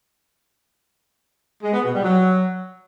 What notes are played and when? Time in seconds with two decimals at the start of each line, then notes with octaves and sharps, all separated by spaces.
1.63 G#3
1.73 B3
1.83 B2
1.94 G3
2.04 F#3